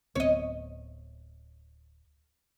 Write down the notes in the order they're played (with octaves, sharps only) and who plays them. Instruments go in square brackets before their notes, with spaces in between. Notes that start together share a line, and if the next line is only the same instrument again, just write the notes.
[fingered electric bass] D1 B3 C4 [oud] C#5 D#5